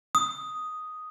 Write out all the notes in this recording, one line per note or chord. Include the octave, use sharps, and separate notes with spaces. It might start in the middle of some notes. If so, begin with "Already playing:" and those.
D#6